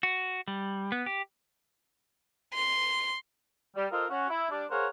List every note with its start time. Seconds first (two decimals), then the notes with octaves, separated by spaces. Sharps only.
0.03 F#4
0.48 G3
0.92 B3
1.06 G4
2.54 C6
3.76 G3
3.92 F4 A4 A#4 C5 D#5 F5
4.10 C#4 F#4
4.29 E4
4.50 G3 D4 D6
4.70 G#4 A#4 C5 C#5 F5 F#5